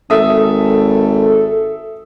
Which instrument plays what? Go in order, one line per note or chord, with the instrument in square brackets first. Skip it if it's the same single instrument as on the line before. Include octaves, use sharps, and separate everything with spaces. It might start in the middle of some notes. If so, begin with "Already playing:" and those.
[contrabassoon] G#1 [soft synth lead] A4 [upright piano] E5 D#6